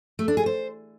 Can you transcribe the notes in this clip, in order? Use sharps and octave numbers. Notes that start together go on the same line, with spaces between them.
A3
D4
G#4
C5